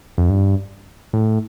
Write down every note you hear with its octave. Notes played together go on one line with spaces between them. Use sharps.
F2
G2
A2